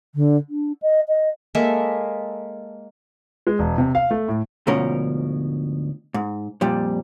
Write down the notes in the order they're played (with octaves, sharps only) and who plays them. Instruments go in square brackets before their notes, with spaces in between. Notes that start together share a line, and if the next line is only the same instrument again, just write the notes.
[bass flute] D3
D4
D#5
D#5
[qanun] G#3 A#3 A4 E5
[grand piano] G#3
E1
C3
F5
A3
A2
[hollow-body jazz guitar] D2 G#2 B2 F3 C#4 A#4
G#2
F2 A#2 G3